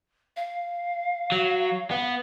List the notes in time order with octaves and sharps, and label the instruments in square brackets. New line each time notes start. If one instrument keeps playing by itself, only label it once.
[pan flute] F5
[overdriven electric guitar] F#3
B3